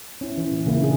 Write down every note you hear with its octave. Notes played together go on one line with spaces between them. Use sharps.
C#4 E4
E3
A#2
C#3 A#3 E4
C#4 D4 G#4